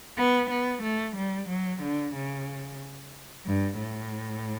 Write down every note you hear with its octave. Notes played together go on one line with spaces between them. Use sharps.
B3
B3
A3
G3
F#3
D3
C#3
G2
A2